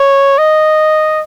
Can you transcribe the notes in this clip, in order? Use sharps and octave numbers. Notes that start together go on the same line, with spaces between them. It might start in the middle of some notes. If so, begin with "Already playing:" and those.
Already playing: C#5
D#5